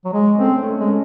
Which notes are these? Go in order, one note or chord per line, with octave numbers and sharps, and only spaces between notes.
F#3
G#3
A3 C4 C#4
A3 C#4
G#3
A3 C#4